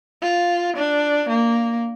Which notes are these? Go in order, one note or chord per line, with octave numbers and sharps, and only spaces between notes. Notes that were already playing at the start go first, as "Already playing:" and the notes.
F4
D4
A#3